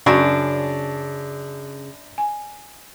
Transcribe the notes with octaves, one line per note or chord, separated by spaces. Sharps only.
F#2 C#3 D4 F#4 C#5 D5
G#5